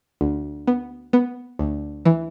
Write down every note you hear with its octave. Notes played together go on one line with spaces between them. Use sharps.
D2
B3
B3
D2
E3